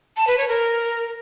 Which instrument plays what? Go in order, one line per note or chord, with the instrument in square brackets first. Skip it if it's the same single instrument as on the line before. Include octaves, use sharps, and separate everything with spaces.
[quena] A5
B4
C#5
A#4